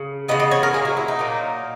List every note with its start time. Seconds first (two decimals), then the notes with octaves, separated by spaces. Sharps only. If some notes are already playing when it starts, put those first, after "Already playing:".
Already playing: C#3
0.28 C#3 E3 B3 D#5
0.40 D#5
0.51 C#5
0.63 A#4
0.74 A#2 F#3 A#3 G#4
0.85 F#4
0.97 E4
1.08 D#4
1.19 A#2 F#3 A#3